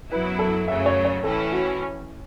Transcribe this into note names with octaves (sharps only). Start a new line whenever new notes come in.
F#2 F#3 B3 E4 B4
A4
F#2 C#3 F#3 A3 E5
C#5
C#5
A1 A2 E3 C#4 E4 A4
F#4